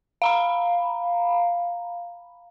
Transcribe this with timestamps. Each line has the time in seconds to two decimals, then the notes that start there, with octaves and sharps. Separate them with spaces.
0.22 F5 A#5 B5